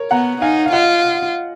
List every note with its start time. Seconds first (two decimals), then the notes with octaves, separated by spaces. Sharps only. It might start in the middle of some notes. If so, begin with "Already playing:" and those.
Already playing: A#4 C#5
0.11 B3 F#5 A#5
0.41 D#4 F5 G#5
0.66 F5
0.72 F4 D#5 F#5